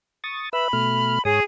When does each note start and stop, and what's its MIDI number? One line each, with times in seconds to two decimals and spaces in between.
0.24 0.49 85
0.24 0.49 87
0.24 0.49 93
0.53 0.68 71
0.53 0.68 76
0.53 1.23 83
0.53 0.68 88
0.73 1.19 47
0.73 1.19 57
0.73 1.19 89
1.25 1.40 44
1.25 1.43 68
1.25 1.40 73
1.25 1.40 87